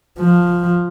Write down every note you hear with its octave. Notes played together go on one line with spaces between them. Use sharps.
F3